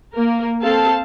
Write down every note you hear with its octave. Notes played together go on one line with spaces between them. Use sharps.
A#3 A#4
C4 A4 F5 A5